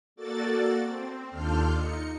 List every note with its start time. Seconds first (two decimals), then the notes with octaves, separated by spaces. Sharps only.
0.16 A#3 F#4 A4 D5 A6
0.81 C4
1.30 D#2 D4 F4 A4 F6 G6
1.74 D#4 C#7